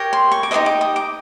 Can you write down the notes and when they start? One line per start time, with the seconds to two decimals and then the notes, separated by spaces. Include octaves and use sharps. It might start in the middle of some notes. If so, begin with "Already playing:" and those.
Already playing: G4 A#4 C#5
0.13 C6
0.32 C#6
0.43 D6
0.51 D#4 G4 C5 D#5 D#6
0.66 D6
0.81 D#6
0.96 D6